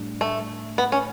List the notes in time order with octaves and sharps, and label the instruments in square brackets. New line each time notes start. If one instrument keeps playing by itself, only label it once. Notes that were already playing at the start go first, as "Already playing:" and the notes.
Already playing: [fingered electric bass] A2 G3 D4
[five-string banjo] A3
B3
C#4